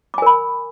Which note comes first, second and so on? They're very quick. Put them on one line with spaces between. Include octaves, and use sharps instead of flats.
D6 G#5 A#4 B5